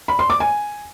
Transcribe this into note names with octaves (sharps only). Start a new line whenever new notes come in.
B5
C6
D6
G#5